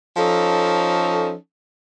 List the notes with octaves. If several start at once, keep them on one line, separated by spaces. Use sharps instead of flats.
F3 C#4 D#4 A4